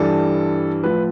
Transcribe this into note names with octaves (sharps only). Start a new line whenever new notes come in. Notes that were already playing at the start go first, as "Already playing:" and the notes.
Already playing: G2 E3 G3 A4
A2 F3 B4